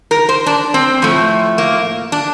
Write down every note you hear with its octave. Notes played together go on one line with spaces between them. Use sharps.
A#4
C5
D4
C4
A2 F3 A3
A#3
D4